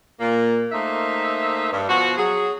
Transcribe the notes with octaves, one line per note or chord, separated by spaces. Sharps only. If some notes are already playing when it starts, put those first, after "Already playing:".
A#2 A#3
A3 A#3 D#4 C5 E5
G2
B2 F3 F4 F#4
F#3 G#4